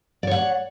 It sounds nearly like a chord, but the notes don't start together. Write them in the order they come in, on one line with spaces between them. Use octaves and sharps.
D5 C#5 F#5